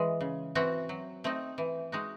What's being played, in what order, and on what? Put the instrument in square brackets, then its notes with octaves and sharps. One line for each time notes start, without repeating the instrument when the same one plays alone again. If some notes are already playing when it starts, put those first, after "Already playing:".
Already playing: [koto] E3 G#3
C#3
E3 C4 F#4
F#3
A3 C4 D#4
E3
G#3 D#4 F#4